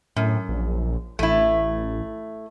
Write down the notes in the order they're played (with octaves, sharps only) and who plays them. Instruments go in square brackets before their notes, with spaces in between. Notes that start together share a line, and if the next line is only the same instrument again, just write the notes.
[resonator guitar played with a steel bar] F#2 [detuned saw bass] A2
[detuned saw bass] A#1
[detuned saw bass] A1 [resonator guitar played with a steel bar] A3 E4